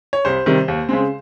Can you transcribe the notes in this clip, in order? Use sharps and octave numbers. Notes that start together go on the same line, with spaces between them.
C#5
C2 C5
C3 D#3 G3
D#2
C#3 G#3 C4